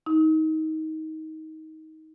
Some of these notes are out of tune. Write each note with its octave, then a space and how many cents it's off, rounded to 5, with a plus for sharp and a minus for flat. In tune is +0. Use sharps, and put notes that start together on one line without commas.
D#4 +20